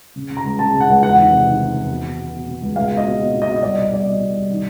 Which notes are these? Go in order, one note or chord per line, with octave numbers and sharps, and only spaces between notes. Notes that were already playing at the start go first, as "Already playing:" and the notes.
C#3
C#3
A#5
C#2
C#3 A5
C#3
F#5
C#2
E2 F#5
D#3
C3
D#3
D#3
E2
B2
B2
B2
B2
B2
C#2
C#2 F5
B2
D#5
B2
B2
B2
D#5
B2
D#5
C2 D5
B2
D#5
C2 D5
B2 D#5
B2
C2
D#3